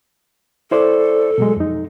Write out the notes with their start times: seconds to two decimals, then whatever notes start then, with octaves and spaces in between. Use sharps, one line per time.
0.71 E4 A4 C5 D5
1.38 B2 F#3 G#3
1.56 F2 D#4